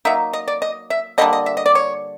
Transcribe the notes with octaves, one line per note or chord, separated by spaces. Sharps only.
F#3 A#3 D#4 E5
D#5
D5
D#5
E5
D3 G3 A#3 D4 D#5
D#5
E5
D#5
D5
C#5